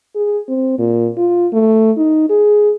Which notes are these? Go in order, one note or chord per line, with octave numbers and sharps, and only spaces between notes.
G#4
C4
A#2
F4
A3
D#4
G#4